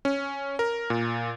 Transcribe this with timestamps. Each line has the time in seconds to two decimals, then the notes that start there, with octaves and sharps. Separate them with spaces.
0.05 C#4
0.59 A#4
0.90 A#2